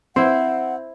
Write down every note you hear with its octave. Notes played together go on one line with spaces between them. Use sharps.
C4 E4 C5 F#5